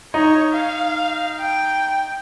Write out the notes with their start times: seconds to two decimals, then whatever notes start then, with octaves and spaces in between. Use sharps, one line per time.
0.14 D#4 C#5
0.52 F5
1.41 G5